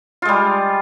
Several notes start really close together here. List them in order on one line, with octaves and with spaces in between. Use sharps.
F4 G#3 G3